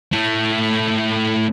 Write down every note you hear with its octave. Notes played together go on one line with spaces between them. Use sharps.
A2 A3